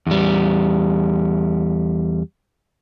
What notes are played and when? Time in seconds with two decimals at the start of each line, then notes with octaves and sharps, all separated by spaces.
0.07 E2 G3